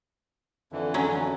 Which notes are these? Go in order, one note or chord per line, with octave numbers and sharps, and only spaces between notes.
F2 D3 E3
F#3 C#4